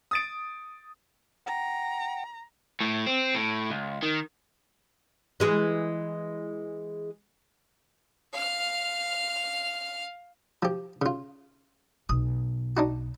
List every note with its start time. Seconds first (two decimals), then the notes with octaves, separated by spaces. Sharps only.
0.11 D#6 A6 D7
1.46 F#5 G5 A#5
2.80 A2
3.06 C4
3.35 A2
3.71 C#2
4.03 D#3
5.40 E3 G#3 G#4
8.33 F5 F6
10.63 F3 G4
11.02 C#3 F4
12.09 B1 D#6
12.77 D4 D#4 F#4